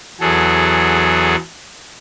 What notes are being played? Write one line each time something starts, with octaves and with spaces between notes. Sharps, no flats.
E2 F#3 G#4 A4